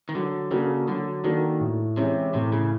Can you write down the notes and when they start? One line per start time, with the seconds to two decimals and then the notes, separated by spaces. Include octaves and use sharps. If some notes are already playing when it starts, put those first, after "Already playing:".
0.09 D#3
0.15 D3 F#3
0.51 C#3 A#3 D4 F#4 A4
0.88 D3 F#3
1.24 D#3 A#3 D4 F#4 A4
1.60 A2
1.97 C3 E3 G#3 C#4 E4
2.34 A2 C3
2.52 C#3